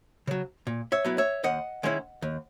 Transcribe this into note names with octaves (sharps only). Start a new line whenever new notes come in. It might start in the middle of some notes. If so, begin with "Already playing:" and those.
C#3 F#3
A#2
C#5 E5
F#3 B3 E4
C#5 E5
D#2 D#5 F#5
D#3 G#3 C#4 E4
D#2